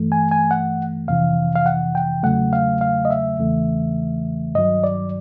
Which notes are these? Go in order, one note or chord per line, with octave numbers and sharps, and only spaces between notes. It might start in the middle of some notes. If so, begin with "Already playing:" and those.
Already playing: G2 E3 A3
G#5
G#5
F#5
F2 C3 E3 F5
F5
F#5
G5
E2 C#3 F#3 A3 F#5
F5
F5
D#5
E5
E2 C#3 E3 A3
G2 D#3 F#3 D#5
D5